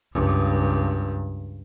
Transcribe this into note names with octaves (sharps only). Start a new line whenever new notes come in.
C#2 G2